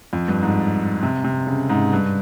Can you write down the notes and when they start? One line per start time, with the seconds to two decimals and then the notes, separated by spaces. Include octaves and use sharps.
0.13 F2
0.28 G2
0.43 G#2
1.03 C3
1.24 C3
1.47 C#3
1.70 G#2
1.93 G2